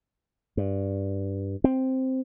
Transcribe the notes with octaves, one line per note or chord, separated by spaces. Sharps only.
G2
C4